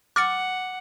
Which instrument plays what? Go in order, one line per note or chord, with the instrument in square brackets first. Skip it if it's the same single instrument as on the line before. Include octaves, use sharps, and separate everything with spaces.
[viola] F#5 [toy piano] D6 [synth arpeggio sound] F6 A6 C#7